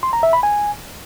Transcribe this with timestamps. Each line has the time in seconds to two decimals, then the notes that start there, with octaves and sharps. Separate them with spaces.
0.03 C6
0.13 A#5
0.23 E5
0.33 B5
0.43 G#5